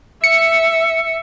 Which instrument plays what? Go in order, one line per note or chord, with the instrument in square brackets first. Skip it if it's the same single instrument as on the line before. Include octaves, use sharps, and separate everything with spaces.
[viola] E5 [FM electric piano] C#7